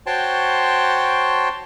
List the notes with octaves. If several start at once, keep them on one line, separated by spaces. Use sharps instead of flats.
F#4 C5 C#5 G5 A5 C6